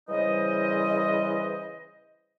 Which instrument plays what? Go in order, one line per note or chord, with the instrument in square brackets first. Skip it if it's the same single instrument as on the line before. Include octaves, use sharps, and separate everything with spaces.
[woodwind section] C#3 E3 G3 C5 D#5